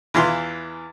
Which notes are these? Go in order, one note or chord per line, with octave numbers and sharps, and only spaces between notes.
E2 E3 F4 C6